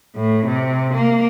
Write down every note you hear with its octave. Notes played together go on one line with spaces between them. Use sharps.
A2
C3
A#3